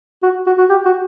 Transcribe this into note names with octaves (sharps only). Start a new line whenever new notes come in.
F#4
F#4
F#4
G4
F#4